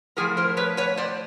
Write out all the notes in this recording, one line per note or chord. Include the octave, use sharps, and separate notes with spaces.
A2 F3 G#4 A#4
A#4 C5
B4 C#5
B4 C#5
C5 D5